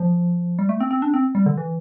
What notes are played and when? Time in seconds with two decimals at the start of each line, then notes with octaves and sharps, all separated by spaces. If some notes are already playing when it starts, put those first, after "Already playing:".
Already playing: F3
0.59 G3
0.69 A3
0.80 C4
0.91 C4
1.02 D4
1.14 C4
1.35 G3
1.46 D3
1.58 E3